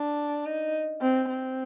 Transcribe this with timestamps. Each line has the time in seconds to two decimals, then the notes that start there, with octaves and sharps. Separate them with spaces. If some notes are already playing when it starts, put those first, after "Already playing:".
Already playing: D4
0.46 D#4
1.02 C4
1.30 C4